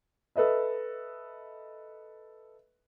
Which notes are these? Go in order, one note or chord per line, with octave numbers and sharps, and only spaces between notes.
A4 B4 D#5 E5